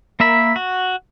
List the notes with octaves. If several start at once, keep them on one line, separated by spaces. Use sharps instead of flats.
A#3 A#4 E5 B5
F#4